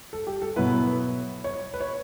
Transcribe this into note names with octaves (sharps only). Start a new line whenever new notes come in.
A4
G4
A4
B2 F#3 B3 E4 B4
C#5
B4
C#5